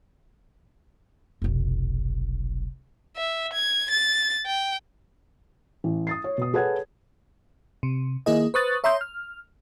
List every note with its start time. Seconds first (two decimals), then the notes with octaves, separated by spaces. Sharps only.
1.42 F1 B1
3.17 E5
3.53 G#6
3.90 A6
4.46 G5
5.84 A1
6.07 D#6 A6 C7
6.24 C#5
6.38 B2 D#6
6.53 G#4 A4 B4 C#5 F#5 G#6
7.83 C3
8.26 D#3 A#3 E4 G#4 D#5
8.54 B4 C5 C#6 D#6 F#6 A6
8.84 C#5 E5 A#5 C6 D#6 G6
9.01 F6